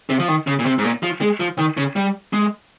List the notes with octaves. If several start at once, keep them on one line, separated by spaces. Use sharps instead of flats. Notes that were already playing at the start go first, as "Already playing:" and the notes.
C3
F3
D#3
C#3
A#2
C3
G#2
A#2
F3
G#3
F3
D#3
C#3
G3
G#3